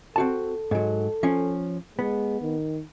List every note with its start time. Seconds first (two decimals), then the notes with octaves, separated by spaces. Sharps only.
0.16 C4 F#4 A4 A5
0.71 G#2 F#3
1.23 F3 C#4
1.99 G#3 B3
2.41 D#3